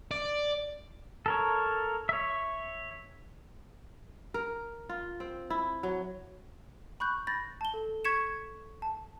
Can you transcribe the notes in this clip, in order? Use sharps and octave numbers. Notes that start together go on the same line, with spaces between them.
D5
A4 A#4 C#5
C#5 E5
A#4
F4
C4
E4
F#3
B5 C#6 F#6 G6
B5 G6 A6 A#6
A5 G7
A4
C#6 G#6 B6 C#7 E7
A5